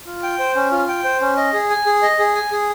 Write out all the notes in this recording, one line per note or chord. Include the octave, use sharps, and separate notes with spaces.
F4
G5
C5
C#4
F4
G5
C5
C#4
D#5
G#4
G#5
G#4
D#5
G#4
G#5
G#4